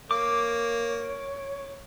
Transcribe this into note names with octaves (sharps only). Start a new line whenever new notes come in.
A#3 C#5 D6